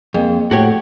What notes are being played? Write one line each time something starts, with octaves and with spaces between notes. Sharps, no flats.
F2 A#3 G#4
A2 A3 F#4 G4 A4 C#5